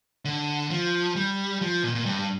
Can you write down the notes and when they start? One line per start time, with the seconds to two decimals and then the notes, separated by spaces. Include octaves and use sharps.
0.25 D3
0.71 F3
1.16 G3
1.61 F3
1.84 A#2
1.95 A#2
2.06 G2